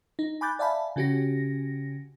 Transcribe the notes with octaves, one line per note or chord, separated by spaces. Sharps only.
D#4
G#5 B5 D6 F#6 G6 A6
D5 E5 F5 G#5 A5 B5
C#3 C#4 F#4 G4 A#6